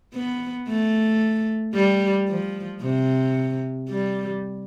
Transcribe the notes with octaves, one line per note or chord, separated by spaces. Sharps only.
B3
A3
G3
F3
C3
G3